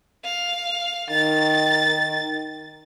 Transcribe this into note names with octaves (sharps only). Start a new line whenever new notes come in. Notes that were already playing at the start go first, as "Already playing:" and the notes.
F5
D#3 A6